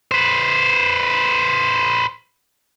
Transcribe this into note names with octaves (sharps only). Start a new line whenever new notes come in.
B4 C5